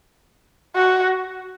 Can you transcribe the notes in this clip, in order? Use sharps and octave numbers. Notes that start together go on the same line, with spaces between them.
F#4